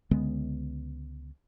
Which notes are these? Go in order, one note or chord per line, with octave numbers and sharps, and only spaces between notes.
C#2 D3 G#3 B3